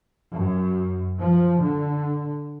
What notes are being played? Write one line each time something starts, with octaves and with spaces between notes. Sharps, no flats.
F#2
F3
D3